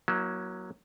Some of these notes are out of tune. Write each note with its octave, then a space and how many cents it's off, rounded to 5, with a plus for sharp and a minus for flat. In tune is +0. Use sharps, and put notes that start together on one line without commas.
F#3 +0 A#3 +30 E4 -25